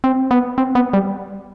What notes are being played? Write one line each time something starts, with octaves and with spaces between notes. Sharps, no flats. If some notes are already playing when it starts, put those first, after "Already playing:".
C4
B3
C4
B3
G3